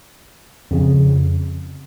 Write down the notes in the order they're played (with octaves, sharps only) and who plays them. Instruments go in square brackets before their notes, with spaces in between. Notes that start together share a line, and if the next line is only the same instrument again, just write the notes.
[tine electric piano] F2 C#3